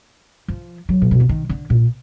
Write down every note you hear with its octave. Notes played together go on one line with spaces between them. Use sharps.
F3
F#3
A#2
B2
D3
D#3
D3
A#2